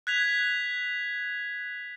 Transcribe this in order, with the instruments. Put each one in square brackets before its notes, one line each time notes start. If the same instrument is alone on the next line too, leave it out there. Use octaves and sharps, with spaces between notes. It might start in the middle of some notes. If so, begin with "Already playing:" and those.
[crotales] F#6 G#6 B6 F7